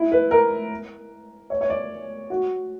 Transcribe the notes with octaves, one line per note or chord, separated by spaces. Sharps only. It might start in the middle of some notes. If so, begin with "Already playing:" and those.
Already playing: E4
B4
A#4
C#5
C#5
D5
F#4